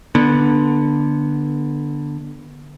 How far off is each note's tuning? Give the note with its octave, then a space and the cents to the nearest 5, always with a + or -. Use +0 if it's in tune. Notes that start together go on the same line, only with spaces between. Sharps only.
D3 +5 B3 -20